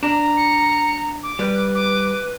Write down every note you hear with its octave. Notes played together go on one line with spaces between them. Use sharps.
D4 A#5
C#7
D6
G3 B4
D6